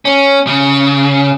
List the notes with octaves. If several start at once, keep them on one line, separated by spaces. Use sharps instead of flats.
C#4
C#3